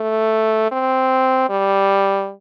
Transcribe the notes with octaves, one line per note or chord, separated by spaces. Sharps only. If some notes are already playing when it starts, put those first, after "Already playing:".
Already playing: A3
C4
G3